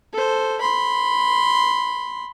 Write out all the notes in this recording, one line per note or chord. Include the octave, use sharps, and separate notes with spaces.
A4 C5
B5 C6